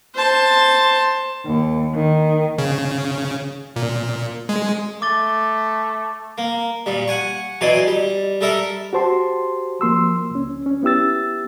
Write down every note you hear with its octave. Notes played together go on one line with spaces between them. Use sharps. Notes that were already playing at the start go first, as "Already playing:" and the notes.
C5 A5
D#2
D#3
C#3
A#2
G#3
A3 D6 A6 G7
A#3
A#2 G3
F#5 G#5 C#6
B2 E3 F#3 D5 C6
G3
G3 A4 A#4 E5
F#4 G4 C5 A5 C6
F3 A#3 C6 E6
C#2 C#4
C#4
B3 E4 G4 E6 A6